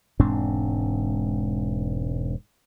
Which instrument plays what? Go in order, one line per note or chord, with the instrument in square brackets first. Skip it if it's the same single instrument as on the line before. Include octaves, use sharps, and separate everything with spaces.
[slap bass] E1 G#2 C4 D4